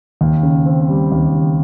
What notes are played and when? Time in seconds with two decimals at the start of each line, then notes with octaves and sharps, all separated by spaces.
0.21 D#2
0.43 C#3
0.66 C4
0.89 G3
1.12 D#2
1.35 C#3